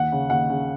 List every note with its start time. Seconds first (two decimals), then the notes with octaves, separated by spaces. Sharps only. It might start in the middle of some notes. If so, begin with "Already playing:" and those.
Already playing: D#2 F#5
0.12 C#3
0.30 D#2 F#5
0.49 C#3